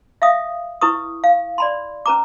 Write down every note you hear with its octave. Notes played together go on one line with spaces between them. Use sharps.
E5 F5 D#6
E4 B4 C#6 D#6
F5
D5 B5 C6
C#4 B4 A#5 D6